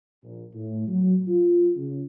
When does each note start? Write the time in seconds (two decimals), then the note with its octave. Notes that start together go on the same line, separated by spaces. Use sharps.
0.23 A#1
0.54 A2
0.88 F#3
1.27 F4
1.77 C#3